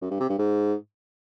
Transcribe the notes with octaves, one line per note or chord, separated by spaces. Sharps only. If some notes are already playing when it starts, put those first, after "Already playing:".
F#2
G2
C3
G2
G#2